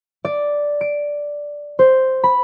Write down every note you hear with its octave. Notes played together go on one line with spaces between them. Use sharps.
D5
D7
C5
B5